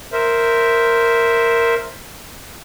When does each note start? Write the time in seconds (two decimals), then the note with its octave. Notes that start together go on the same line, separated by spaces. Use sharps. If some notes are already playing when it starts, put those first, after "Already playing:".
0.13 A#4 C5 E5